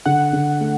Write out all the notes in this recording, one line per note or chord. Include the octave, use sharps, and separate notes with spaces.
D3 F#5
D3
A3